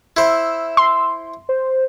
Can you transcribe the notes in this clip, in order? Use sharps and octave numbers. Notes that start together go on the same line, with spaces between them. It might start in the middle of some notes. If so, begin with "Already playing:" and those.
E4 C5 E6
C6
C5